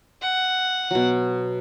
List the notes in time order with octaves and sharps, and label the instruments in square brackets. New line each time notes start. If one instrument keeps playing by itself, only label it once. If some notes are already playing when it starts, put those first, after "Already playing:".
[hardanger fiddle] F#5
[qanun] B2 F#3